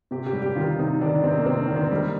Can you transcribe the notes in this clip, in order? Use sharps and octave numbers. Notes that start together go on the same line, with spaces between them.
C3 G4
G4
G3
G4
D#3 F4
C3 D#4
D#3 D4
C3 C4
A#3
C3 C4
D4
D#3
C4
G3 A#3